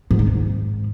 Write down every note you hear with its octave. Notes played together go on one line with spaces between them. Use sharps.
G#2
D#3
G#2